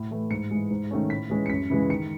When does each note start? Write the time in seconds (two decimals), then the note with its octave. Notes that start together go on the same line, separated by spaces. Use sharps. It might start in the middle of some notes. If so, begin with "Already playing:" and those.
Already playing: A2
0.11 E3 A3
0.30 G#2 C#7
0.51 E3 G#3
0.70 G#2
0.91 D#3 A3 C#4
1.10 A2 B6
1.30 E3 G#3 C#4
1.46 C#7
1.50 F#2 B6
1.70 C#3 E3 G#3
1.89 D#3 C#7